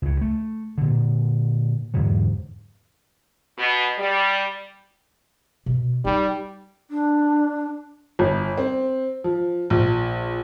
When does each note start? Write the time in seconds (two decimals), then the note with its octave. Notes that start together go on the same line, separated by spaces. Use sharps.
0.02 C#2 C#3
0.21 A3
0.78 A#2 D3
1.94 E2 G#2 D3 F#3
3.58 B2
3.98 G3
5.66 B2
6.05 G3 D#4
6.90 D4
8.19 G1
8.58 C4
9.24 F3
9.70 A#1